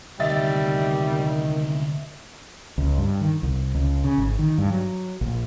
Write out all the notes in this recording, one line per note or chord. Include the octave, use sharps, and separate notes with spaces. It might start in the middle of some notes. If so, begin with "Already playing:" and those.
D2 C3 D#3 G3 D#5 E5 A6
C#2
G2
D#3
C2
C#2
C#3
G#1
D#3
G2
F#3
A#1